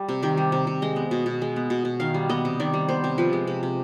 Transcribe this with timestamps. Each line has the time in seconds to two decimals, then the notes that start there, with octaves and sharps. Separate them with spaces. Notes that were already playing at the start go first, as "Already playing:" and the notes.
Already playing: G3
0.09 C3
0.22 D#3 G4
0.37 G3
0.52 C3
0.67 C3
0.82 G#3 D#5
0.96 B3
1.11 B2
1.26 B2
1.42 G#3
1.56 B3
1.70 B2
1.85 B2
2.00 D#3 F5
2.14 G3
2.29 B3 D#5
2.45 C3
2.60 D#3 D5
2.74 G3
2.89 B3 C5
3.04 C3
3.18 F3 B4
3.33 G#3
3.47 C3
3.63 C3